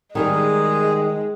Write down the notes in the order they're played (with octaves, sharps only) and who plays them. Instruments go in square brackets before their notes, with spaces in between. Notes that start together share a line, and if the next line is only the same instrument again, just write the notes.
[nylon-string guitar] D#3 G3 A#4 [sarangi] G#3 [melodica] G#4